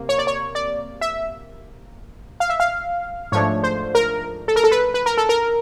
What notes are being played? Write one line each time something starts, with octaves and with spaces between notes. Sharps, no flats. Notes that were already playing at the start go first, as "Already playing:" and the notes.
Already playing: C3 A#3
C#5
D5
C#5
D5
E5
F5
E5
F5
G#2 F3 A3 D4 C#5
C5
A#4
A4
A#4
A4
B4
B4
A#4
A4
A#4